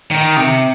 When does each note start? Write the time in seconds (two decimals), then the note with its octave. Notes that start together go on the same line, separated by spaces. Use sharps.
0.11 D#3
0.37 C3